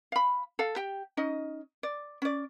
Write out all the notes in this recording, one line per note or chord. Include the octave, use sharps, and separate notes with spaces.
F5 B5
A4 F5
G4 G5
C#4 D#4 D#5
D5
C#4 D5